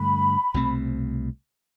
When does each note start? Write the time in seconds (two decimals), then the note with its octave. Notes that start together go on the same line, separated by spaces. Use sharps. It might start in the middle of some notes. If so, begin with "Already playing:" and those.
Already playing: G2 D3 A3 B5
0.54 C2 B2 A3 C4